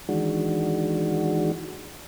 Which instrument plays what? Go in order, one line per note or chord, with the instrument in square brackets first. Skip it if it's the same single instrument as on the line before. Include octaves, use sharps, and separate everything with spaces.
[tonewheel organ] D#3 E3 G#3 D4 F#4